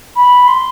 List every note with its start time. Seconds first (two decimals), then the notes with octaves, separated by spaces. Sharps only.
0.16 B5
0.48 C6